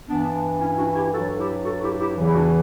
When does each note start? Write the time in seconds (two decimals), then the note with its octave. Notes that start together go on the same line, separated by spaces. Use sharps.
0.08 G2 E3 B3 D4
0.60 C#4 E4
0.73 E4
0.78 D4 F#4
0.95 E4 G4
1.12 G2 F#3 F#4 A4
1.38 E4 G4
1.65 F#4 A4
1.82 E4 G4
1.99 E4 G4
2.17 E2 C#3 E3
2.26 E4
2.34 D4 F#4